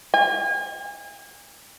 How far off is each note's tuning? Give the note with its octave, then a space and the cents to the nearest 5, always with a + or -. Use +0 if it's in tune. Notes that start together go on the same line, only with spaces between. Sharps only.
G#5 -35